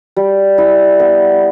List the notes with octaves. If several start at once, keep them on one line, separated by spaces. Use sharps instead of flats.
G3
E4
B3